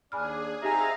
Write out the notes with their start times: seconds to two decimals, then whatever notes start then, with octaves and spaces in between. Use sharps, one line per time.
0.12 D#2 D4 G#4 G#5 B5 F6
0.63 C4 D#4 G4 G#4 E5 F5 G#5 A#5